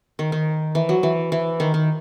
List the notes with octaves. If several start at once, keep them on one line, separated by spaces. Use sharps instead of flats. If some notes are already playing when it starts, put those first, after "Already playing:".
D#3
D#3
E3
F#3
E3
E3
D#3
D#3